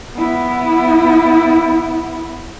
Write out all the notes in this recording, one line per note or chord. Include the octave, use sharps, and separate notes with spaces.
B3 E4